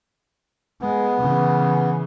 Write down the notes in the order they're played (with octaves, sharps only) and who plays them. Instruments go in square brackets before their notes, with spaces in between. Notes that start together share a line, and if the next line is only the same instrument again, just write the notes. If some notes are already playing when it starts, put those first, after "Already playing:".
[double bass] G#3 [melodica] B3
[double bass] C#3 E3